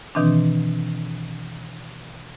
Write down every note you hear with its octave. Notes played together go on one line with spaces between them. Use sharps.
B2 D#3 E3 C4 D4